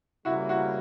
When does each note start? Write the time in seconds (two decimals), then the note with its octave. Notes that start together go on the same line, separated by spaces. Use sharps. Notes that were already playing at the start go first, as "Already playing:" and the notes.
0.25 C#3 E3 G3 A#3 E4 F#4
0.49 E4 F#4